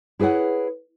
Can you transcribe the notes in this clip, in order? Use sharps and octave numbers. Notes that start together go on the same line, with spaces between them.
E4 G#4 B4 C#5 F#5